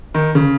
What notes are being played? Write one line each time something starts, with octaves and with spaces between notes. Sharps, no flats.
D#3
C#3